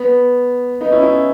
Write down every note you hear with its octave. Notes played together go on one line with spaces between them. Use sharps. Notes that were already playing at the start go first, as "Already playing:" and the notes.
Already playing: B3
B3 D#4
C#4 E4
C#4 E4